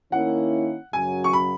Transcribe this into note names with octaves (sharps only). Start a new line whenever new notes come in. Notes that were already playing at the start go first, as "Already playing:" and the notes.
D#3 A#3 C#4 E4 F#5
F#2 C#3 F#3 G#5
C#6
B5